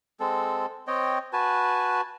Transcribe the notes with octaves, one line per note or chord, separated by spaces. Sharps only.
G#3 C4 A4
C4 C#5 D#5 G5
F#4 B4 G#5 A5